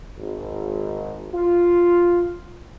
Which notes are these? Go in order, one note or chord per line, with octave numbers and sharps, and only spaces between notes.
G#1
F4